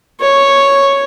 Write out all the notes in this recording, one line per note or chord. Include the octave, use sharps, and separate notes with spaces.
C#5